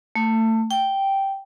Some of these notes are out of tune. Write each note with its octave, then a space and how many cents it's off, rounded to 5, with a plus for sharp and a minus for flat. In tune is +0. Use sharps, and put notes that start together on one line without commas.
A3 +25
G5 -5